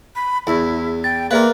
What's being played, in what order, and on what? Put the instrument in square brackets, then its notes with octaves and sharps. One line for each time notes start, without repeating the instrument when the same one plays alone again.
[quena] B5
[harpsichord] E2 [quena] E4 [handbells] G#4
[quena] G5 [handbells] A6
[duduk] A#3 [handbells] G#4 E5 F5 [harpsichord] A#4 B4 [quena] D5